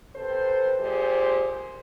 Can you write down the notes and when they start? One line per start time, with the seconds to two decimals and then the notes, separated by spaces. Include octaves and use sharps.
0.15 C3 A4 B4 C5
0.77 A#2 G#3 G4 C5